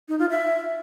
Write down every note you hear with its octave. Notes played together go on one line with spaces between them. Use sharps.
D#4
F4
E5